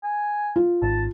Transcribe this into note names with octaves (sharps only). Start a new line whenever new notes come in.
G#5
F4
G#1 A5